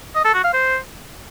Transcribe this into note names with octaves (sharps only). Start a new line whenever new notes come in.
D#5
A4
F#4
F5
C5